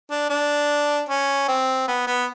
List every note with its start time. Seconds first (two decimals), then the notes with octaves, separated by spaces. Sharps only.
0.10 D4
0.29 D4
1.09 C#4
1.48 C4
1.88 B3
2.07 B3